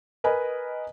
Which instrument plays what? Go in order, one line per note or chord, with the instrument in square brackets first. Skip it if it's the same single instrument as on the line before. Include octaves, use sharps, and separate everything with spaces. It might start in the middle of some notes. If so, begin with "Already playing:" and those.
[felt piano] A#4 B4 D#5 G#5 B5